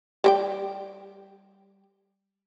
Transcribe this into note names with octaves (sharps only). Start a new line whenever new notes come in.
G3 G4 G5